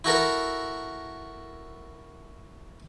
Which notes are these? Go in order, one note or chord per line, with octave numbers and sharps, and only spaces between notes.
E4 F#4 A4 A#4